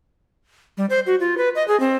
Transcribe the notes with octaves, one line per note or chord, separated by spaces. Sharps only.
G3
C5
F#4
F4
B4
D#5
G#4
C4